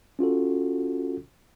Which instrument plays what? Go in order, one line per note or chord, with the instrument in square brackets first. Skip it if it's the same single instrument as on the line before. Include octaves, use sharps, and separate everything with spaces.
[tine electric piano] C#4 F4 F#4 A4